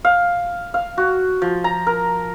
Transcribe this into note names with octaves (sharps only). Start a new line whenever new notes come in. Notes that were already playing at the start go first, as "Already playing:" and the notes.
F5
F5
F#4
F3
A#5
A#4